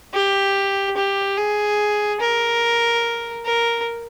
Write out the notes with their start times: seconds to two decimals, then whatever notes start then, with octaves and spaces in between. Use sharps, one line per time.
0.14 G4
0.97 G4
1.38 G#4
2.21 A#4
3.45 A#4